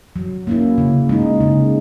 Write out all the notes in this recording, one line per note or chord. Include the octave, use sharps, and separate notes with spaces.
F#3
A#3 C#4 E4
C#3
G#3 D#4
C#3